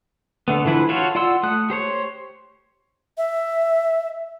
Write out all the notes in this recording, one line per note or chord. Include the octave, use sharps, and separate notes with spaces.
D3 A3 B3
D3 E3 F3 E4 B4
F4 F#4 A4 C#5
F4 D5 F#5 C6 E6
A3 D#6 F#6
G4 C5 C#5
E5